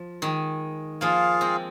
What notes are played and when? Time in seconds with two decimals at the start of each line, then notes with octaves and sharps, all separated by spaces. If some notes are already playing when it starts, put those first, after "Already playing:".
Already playing: F3
0.22 D#3 G#3
1.01 F3 A#3 F4 G#4 F5
1.41 G#3 C4